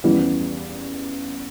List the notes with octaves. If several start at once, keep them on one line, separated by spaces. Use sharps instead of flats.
E2 C#3 E3 G3 B3